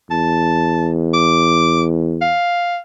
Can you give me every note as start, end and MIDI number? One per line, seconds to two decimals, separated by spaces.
0.11 2.35 40
0.11 0.88 81
1.13 1.83 86
2.22 2.78 77